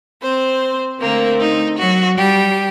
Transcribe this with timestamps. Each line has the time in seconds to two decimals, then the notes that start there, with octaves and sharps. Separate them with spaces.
0.22 C4 C5
1.01 D3 A3 A#3 C4 A#4
1.40 D#4
1.79 F#3 F#4
2.18 G3 G4